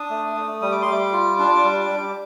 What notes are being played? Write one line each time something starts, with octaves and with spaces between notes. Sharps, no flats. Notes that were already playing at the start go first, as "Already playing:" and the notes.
Already playing: D4 D#6
A3
A3
G3 D#6
D6
C6
G3 D6
F4
D4
G3
G3